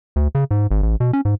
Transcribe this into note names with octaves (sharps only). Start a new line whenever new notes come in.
D2
C#3
G#2
G#1
A1
B2
C#4
G#2